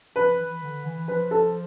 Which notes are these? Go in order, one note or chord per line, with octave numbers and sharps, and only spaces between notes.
F3 B4
E3
D3
E3
F3 B4
A4